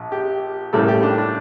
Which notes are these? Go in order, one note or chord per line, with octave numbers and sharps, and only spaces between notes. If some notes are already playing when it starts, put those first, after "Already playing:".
Already playing: A#1 F3
G4
A1 A2 G3 A#3 A4
G4
D4
D4